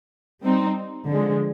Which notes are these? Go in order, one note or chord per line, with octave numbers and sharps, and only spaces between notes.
G3 C4 D#4
D3 F3 G#3